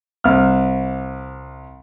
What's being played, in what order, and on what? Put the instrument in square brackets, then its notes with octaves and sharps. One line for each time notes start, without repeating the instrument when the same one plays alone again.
[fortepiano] C2 F6